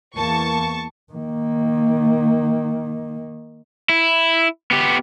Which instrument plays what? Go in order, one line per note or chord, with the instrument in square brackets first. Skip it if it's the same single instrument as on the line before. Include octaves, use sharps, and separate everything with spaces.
[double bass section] E2 A#3 [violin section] A5 C#6
[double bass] D#3 A#3
[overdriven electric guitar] E4
B3 G4